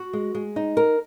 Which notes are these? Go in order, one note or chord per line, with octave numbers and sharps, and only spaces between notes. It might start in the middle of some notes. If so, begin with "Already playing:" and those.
Already playing: F#4
G#3
G#3
D#4
A#4